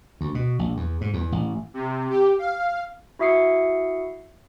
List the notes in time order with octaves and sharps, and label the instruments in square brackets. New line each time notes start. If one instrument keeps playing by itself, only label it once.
[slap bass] D2
B2
A#1
E2
G#2
E2
A1
[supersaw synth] C3
G4
F5
[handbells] E4 F#4 E5 D#6 C7 C#7